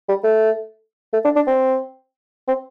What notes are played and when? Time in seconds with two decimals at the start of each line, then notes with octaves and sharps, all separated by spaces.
0.09 G3
0.24 A3
1.13 A3
1.25 D4
1.36 D4
1.47 C4
2.48 C4